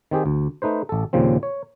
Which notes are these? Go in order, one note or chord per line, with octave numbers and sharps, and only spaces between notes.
D#3 C4 G4 G#4
D2
A3 D#4 B4 C5
A1 A4
D#2 A#2 C#3 F3 C4
C#5